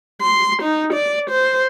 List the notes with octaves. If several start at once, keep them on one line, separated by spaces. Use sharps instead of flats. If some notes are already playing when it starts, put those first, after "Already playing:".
C6
D#4
D5
C5